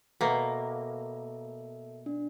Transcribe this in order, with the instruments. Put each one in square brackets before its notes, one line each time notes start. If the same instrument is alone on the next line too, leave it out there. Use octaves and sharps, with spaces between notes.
[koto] B2 A#3 [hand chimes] A4 E5
[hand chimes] D4